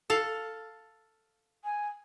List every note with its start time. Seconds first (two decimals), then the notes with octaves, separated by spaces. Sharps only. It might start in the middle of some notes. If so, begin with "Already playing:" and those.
0.10 A4 F5
1.64 G#5